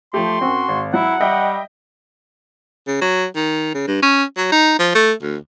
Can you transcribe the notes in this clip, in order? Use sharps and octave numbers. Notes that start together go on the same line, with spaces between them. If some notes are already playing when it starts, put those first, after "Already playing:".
F3 A3 G4 C6
F#2 C4 F#4
G#1
F#3 E4 F#5
G3 D#5 E5 G5
C#3
F#3
D#3
C#3
G2
C#4
F#3
D#4
F3
A3
D2